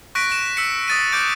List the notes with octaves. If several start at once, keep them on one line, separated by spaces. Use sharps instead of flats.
C#6 F#6 A#6 B6 D7
E7
E6 B6 C#7
D#6 A6 D#7
D6 F#6 G6 A#6 D7